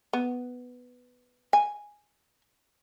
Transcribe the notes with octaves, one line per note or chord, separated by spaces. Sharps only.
B3
G#5